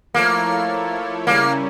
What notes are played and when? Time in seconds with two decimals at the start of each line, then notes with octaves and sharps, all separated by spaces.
0.14 F3 A3 A#3 E4 A4 C#5
1.27 C#3 G3 A#3 C#4 E4